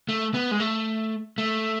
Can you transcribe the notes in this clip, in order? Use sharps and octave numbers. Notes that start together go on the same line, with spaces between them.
A3
B3
G#3
A3
A3